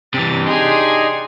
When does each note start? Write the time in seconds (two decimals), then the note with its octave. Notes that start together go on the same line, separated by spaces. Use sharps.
0.14 C3 E3 D4 G4 A6
0.46 D#4 G#4 D5 G#5 C6